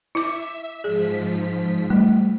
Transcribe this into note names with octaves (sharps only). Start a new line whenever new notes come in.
E4 E5 D6
G#2 F3 G#4 B6
G3 A3